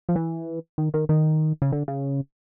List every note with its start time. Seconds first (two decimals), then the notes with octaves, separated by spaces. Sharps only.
0.09 F3
0.16 E3
0.78 D#3
0.94 D#3
1.09 D#3
1.62 C#3
1.72 D3
1.88 C#3